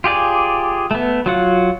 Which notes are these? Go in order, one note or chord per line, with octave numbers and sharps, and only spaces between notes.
F4 G4 G#4 D5
A3 B3
F#3 F4 F#5